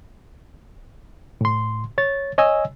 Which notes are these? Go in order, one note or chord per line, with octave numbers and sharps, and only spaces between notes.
A2 C6
C#5 A6
C#5 D#5 G#5 E6